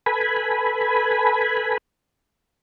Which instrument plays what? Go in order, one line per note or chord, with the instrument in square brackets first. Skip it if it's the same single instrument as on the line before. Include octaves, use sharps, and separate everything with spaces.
[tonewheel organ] A4 B4 G#5 B5